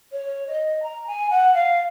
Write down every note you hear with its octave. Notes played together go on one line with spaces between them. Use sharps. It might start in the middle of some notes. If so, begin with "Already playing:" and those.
C#5
D#5
A#5
G#5
F#5
F5